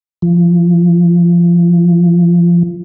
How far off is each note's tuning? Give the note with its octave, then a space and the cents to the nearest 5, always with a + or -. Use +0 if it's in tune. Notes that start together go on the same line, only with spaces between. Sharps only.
F3 -20